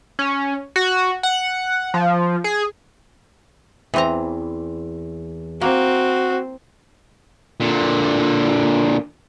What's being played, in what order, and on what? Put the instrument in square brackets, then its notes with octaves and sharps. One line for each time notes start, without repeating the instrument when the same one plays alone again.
[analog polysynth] C#4
F#4
F#5
F3
G#4
[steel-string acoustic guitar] E2 [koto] E3 C4 A#5
[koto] A#3 [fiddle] C4 [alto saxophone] F#4
[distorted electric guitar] A#2 D3